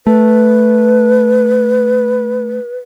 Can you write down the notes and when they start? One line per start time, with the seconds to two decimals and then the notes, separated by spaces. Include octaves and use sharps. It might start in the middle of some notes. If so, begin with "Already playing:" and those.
0.07 A3 B4